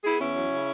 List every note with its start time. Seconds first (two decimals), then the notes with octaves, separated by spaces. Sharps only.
0.04 B3 E4 G#4
0.20 E2 C#4 E4
0.35 F#3
0.51 C#3